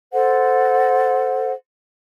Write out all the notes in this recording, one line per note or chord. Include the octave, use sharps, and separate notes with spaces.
A4 C5 F#5